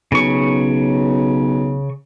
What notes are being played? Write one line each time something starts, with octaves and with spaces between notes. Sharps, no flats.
B1 C#3 C#6